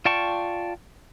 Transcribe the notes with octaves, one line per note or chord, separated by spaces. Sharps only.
F4 D5 G5 A5 C#6